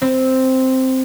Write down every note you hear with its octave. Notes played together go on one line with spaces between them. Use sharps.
C4 C5